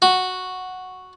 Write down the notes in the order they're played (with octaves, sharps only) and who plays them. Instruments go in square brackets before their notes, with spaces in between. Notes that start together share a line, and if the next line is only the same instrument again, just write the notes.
[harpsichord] F#4